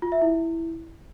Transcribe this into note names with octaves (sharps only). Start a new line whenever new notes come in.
F4
E5
E4